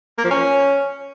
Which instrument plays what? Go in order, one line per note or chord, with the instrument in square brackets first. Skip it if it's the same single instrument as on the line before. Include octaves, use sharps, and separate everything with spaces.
[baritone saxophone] A#3
F3
C#4